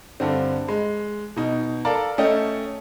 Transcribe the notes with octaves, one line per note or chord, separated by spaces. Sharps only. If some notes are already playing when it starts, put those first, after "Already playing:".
G2 D3 C4
G#3
B2 D#4
A4 A#4 D5 F5 A5
A3 C#4 A4 D#5 G5